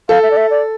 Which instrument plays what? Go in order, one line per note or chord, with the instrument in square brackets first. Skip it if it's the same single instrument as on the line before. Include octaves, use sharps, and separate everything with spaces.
[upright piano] A4 [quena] F5
[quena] E5
D5
E5
D5